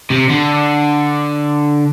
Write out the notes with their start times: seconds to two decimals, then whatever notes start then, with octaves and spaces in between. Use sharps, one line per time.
0.10 C3
0.30 D3